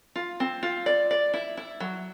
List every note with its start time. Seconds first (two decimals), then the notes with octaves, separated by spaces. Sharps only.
0.16 F4
0.40 C4
0.63 F4
0.86 D5
1.11 D5
1.34 E4
1.57 E4
1.80 F#3